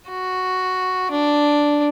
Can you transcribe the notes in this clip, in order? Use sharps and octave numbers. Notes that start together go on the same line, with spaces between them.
F#4
D4